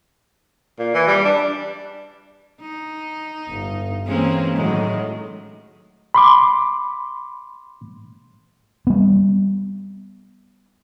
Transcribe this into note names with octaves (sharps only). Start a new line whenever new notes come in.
A#2
E3
G3
D4
D#4
G1 G2
E3 G#3 A#3 C4 C#4
A2 D#3 F#3 G#3
B5 C6 D6
G3 B3